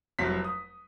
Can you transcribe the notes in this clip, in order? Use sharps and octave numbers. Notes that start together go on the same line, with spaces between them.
F1 C2 F#3 B6
D#6